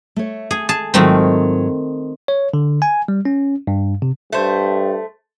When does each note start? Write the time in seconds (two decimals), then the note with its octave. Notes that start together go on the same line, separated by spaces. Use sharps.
0.16 A3 C#5
0.51 G#4 A4
0.69 G#4 A5
0.94 G#2 D#3 F#3 A3 C4 F4
2.28 C#5
2.54 D3
2.82 G#5
3.08 G3
3.25 C#4
3.67 G2
4.02 C3
4.32 G2 A3 C5